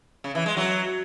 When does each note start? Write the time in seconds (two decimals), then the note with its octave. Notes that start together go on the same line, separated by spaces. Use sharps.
0.24 C#3
0.35 E3
0.46 G#3
0.57 F#3